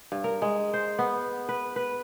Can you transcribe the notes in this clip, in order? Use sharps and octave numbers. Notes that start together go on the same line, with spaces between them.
G2
A#4
G#3
C5
B3
B4
B4